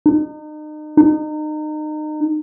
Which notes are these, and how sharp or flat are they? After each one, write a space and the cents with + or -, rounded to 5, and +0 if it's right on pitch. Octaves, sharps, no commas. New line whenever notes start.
D#4 -35
D#4 -30